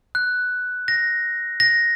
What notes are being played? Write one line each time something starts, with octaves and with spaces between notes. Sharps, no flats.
F#6
A#6
A#6